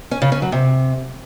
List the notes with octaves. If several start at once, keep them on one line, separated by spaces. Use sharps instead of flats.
C#4
C#3
C#4
F#3
C3